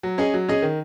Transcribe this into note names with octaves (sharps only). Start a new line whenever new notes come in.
F#3
C#4 G#4 D#5
F#3
C#4 G#4 D#5
D#3